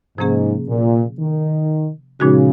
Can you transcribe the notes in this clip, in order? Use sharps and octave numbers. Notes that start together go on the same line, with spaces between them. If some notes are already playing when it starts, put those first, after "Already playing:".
G#2 C3 F3 A#3 C#4 G#4
A#2
D#3
A#2 C#3 F3 G#3 D#4 F#4